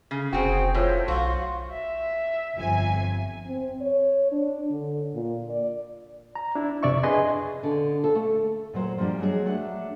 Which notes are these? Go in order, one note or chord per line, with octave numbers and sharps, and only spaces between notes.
C#3
F1 C4 F#4 G#4 C5 G5 G#5
A2 F4 C5 C#5
B1 F#4 F5 C6 C#6
E5
G1 F2 G#5
C4
C#5
D4
D3
A#2
D5
A#5
D4 E4
F2 C3 D5 E5 C#6
D4 G#4 B4 D#5 G#5 C6
D3
A4
A3
A#2 F#3 C5
F3 G3 A#3 D4
F#3 G#3 F#4 G#4
A3 D4 F#5